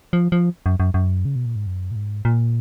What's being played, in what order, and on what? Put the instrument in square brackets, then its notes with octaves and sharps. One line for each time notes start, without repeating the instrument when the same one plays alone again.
[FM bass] F3
F3
F#2
F#2
F#2
C#3
B2
A#2
G#2
F#2
A#2
G#2
A#2